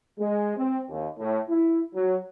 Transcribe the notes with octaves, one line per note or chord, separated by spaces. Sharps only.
G#3
C4
D#2
A2
E4
F#3